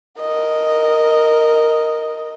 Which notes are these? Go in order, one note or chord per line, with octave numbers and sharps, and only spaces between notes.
A#4 D#5